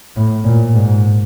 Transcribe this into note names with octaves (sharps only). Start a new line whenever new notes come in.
A2
A#2
G#2